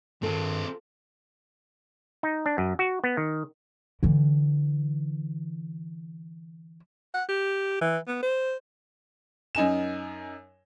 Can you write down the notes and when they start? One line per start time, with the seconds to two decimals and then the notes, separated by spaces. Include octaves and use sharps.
0.23 G2 D#3 C4 F4 G#4 A4
2.23 D#4
2.46 D4
2.58 F#2
2.79 F#4
3.04 B3
3.17 D#3
4.03 D3 E3
7.14 F#5
7.29 G4
7.81 E3
8.07 B3
8.23 C5
9.55 F#2 D#4 G#5 E7